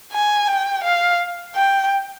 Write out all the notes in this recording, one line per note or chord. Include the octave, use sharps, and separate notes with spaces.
G#5
G5
F5
G5